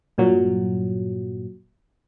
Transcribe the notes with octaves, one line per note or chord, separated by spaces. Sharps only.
G2 A#2 F#3